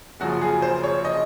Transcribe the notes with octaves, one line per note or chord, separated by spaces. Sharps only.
F#1 F#2 C#3 F3 F#4
G#4
C5
C#5
D#5